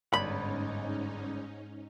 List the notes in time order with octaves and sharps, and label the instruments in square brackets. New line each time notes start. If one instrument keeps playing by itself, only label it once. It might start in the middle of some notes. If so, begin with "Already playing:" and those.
[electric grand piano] G1 D5 [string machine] G#2 C#4 D#4 [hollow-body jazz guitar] B5